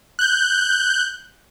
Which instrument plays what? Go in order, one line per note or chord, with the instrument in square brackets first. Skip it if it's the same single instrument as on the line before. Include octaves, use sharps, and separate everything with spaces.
[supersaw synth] F#6 G6